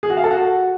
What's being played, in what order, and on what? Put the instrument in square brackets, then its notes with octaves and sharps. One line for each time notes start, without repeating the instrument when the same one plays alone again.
[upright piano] G#4
F#4
F5
A4
F#4